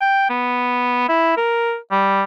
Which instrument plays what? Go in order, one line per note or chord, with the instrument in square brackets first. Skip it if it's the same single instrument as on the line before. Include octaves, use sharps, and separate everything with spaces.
[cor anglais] G5
B3
E4
A#4
G3